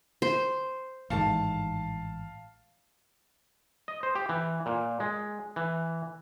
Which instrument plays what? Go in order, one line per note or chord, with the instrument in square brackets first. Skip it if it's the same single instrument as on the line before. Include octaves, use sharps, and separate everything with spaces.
[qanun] C5
[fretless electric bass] A1 G#2 D#3 [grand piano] F5 A5
[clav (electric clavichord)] D#5
C5
G4
E3
A#2
G#3
E3